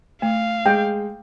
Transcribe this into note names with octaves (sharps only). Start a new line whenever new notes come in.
A3 F5
G#3 G5